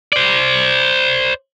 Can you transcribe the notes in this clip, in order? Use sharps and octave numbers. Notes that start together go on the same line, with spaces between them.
C5 D5